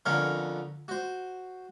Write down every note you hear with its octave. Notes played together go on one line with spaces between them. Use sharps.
F2 D3 B3 C#4 A#4 F5
F#4 C5